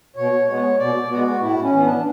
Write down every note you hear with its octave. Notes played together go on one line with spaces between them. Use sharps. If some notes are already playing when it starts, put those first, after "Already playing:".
B2 C#5
G#3 B3 C#5
B2 D5
G#3 B3 F#4
A2 E4
C#4
E3 B3
D4